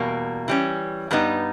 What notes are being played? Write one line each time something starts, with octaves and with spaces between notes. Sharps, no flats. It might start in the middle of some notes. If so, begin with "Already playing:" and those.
Already playing: E2 B2 G3 A#3
E3 G3 C#4
G2 G3 B3 D#4